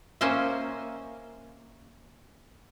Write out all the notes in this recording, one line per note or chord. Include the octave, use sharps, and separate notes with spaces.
A#3 C#4 C5 D#5 E5